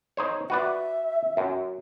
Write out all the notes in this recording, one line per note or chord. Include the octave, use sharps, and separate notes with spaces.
D#4 C5 C#5
F#4 B4 D5 E5
F#2